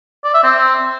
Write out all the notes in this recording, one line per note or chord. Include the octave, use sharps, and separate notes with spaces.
D5
E5
C4